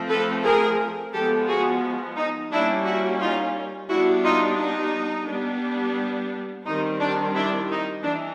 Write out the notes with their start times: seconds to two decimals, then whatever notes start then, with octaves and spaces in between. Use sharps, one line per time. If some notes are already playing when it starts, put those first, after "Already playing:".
Already playing: F3 A3 C4
0.09 A4 B4
0.44 G#4 A#4
1.13 F3 G#3 B3 G4 A4
1.48 F#4 G#4
2.16 D#4
2.52 G3 A#3 C#4 D4 E4
2.85 E4 F#4
3.20 D#4 F4
3.89 G3 B3 D4 E4 F#4
4.24 D#4 F4
4.58 D#4
5.28 G3 B3 D4
6.66 D#3 G3 C4 D#4
7.00 D4
7.35 D4 E4
7.70 D#4
8.04 E3 D4